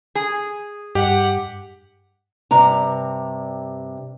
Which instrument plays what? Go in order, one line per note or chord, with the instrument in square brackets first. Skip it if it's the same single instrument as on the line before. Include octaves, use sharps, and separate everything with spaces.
[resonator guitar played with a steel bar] G#4
[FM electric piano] G2 [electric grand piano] G4 [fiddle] F#5
[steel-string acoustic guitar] G2 C3 A#5